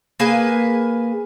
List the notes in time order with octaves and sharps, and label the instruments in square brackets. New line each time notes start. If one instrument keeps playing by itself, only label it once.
[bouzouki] A#3 G#4 B4 G#5